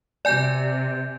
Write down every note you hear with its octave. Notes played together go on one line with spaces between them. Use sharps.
C3 D5 G#5 G6